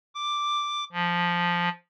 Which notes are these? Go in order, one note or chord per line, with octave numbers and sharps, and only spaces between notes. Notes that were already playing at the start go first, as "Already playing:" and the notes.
D6
F3